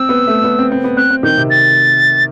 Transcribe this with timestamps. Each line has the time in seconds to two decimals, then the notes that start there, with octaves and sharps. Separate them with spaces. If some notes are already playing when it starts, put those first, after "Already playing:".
Already playing: C4 E6
0.09 B3
0.27 A3
0.44 B3
0.59 C4
0.72 C4
0.84 B3
0.97 C4 F#6
1.10 C4
1.23 D#3 G6
1.37 C3
1.50 A6